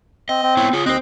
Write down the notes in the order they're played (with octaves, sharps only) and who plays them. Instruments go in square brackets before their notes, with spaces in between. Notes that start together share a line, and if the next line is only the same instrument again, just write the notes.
[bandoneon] C4 [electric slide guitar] D#5
[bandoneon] C4
[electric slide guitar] B3 E4 C#5
[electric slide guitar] F4 C#5 [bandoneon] G#4
[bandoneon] D#2 D#5 F#6 [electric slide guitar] C4 C5